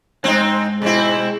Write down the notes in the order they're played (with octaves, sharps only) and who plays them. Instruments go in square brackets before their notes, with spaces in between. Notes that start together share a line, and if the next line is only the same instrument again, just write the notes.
[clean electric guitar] D2 G#2 [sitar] C4 D#4
[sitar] B2 C4 E4 [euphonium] G#3